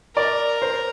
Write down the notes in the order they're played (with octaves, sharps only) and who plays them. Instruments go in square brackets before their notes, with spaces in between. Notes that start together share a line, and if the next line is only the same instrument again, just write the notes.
[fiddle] A#4 [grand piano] D5
[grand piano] C5